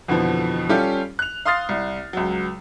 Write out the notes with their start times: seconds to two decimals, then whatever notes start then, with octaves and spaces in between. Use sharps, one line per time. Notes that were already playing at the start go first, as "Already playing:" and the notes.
0.08 F2 B2 D3 E3 F3
0.69 G3 C#4 F4 G4 A4
1.19 F#6 F7
1.45 F5 C6 D#6 F6 A6 C7
1.69 C2
2.13 C#2 F#3